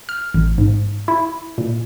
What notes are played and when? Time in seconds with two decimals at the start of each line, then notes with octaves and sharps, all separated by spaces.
0.09 F6
0.34 A1
0.58 G#2
1.08 E4
1.58 A#2